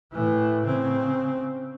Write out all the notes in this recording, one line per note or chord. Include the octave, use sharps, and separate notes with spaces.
A2 E3
C#3 C4